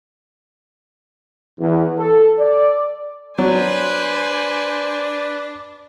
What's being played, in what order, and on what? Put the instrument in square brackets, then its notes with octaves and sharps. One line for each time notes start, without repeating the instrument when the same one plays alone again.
[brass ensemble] E2
A4
D5
[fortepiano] F#3 [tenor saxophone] D4 [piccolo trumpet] B4 [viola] C5 G#5